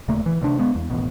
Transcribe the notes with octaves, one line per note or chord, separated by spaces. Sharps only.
D#1 C#3 A3 A#3
E3
D2 C3 D4
G#3 B3
E2
D#1 A1 B2